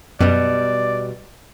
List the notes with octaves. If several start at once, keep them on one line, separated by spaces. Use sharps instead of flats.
F#2 B2 G3 D5